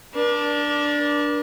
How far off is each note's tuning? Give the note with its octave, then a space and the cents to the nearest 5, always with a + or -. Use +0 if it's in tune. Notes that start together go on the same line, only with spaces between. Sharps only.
D4 +0 A#4 +45